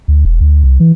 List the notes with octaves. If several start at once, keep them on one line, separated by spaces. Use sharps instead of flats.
D2
E1
D2
C2
E3